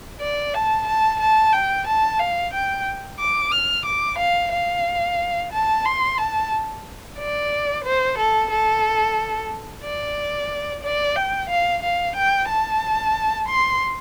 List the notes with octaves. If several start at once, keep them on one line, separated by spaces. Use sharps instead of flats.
D5
A5
A5
A5
G5
A5
F5
G5
D6
F6
D6
F5
F5
A5
C6
A5
D5
C5
A4
A4
D5
D5
G5
F5
F5
G5
A5
C6